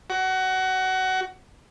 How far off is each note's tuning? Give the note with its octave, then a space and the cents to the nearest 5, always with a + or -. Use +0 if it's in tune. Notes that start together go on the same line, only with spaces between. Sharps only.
F#4 +20